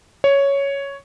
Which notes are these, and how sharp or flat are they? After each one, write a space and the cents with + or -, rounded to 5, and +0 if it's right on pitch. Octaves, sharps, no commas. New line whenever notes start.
C#5 +5